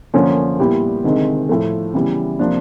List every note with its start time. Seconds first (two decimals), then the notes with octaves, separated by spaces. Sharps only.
0.14 F#2 D3 F3 A#3 C#4
0.59 A#2 G3 B3 E4 G4
1.04 D2 C3 D#3 G#3 C4
1.49 A2 F3 A3
1.94 C#3 E3 G3 B3
2.39 C3 F3 A#3 D4